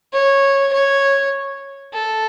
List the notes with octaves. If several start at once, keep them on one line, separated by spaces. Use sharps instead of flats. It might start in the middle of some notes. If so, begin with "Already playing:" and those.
C#5
C#5
A4